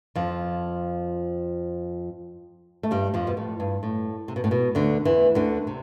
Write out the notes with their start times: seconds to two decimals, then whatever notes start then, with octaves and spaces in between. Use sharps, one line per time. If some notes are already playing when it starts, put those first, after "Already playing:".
0.15 F2 F3
2.83 A3
2.91 G2 G3
3.14 F2 F3
3.27 B2
3.37 A2
3.60 G2
3.83 A2
4.28 C3
4.36 B2
4.44 A2
4.51 B2
4.75 D2 D3
5.05 E2 E3
5.35 D2 D3
5.67 C3